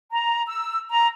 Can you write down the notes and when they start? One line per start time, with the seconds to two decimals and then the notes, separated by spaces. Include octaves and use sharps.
0.10 A#5
0.46 E6
0.90 A#5